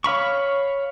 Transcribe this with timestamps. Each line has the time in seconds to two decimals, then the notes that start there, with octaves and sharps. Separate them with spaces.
0.04 C#5 F5 B5 C#6